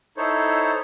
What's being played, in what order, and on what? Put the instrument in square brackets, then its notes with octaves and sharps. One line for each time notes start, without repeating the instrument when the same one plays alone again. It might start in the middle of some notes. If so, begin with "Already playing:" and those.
[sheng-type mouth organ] D#4 E4 A4 C5 C#5